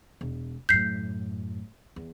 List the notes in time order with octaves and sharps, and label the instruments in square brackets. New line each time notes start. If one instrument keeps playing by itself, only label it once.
[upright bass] E1
[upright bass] F#2 A2 [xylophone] G6 B6 C7
[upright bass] E2